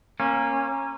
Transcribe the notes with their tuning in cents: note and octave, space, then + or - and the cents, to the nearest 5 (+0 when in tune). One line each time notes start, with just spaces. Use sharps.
A#3 +0 C#4 -25